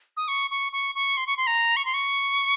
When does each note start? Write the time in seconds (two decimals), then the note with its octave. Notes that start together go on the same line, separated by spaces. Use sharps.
0.17 D#6
0.28 C#6
0.51 C#6
0.72 C#6
0.95 C#6
1.17 C6
1.27 C#6
1.37 C6
1.47 A#5
1.77 C#6
1.85 C6
1.94 C#6